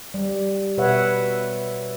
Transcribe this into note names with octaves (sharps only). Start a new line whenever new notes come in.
G3
B2 B4 C#5 E5 F#5